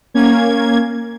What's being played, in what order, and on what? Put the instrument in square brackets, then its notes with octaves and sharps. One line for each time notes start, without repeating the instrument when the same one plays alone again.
[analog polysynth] A#3 C#4 G#6